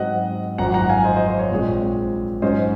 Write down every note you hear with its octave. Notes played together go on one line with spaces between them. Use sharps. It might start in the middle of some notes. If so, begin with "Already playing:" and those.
Already playing: G#2 F#3 C4 D#5 F#5
G#1 F#2 F3 F#5 A#5
F#5 A#5
F5 G#5
C5 D#5
C5 D#5
C5
C#5
A#1 A#2 G#3 C4
G#2 F#3 C#4 C5 D#5